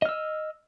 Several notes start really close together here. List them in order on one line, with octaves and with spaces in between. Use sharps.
D#5 F6 E6